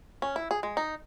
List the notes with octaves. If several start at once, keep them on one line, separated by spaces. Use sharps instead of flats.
C#4
E4
G#4
G#3
D#4